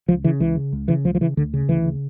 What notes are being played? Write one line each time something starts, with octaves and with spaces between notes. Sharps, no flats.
C#2 F3
C#3 E3
C#2 E3
C#3
C#2
C#3 E3
C#2 F3
F3
C#3 E3
D2 D3
C#3
D2 E3
C#3